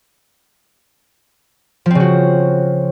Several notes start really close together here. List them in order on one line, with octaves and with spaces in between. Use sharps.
F3 C4 C#3 F#4